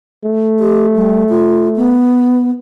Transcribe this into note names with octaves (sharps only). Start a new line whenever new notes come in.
A3
G4
G3
F4
B3